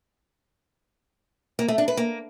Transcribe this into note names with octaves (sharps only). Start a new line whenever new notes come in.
A#3
A3
D4
B4
A#3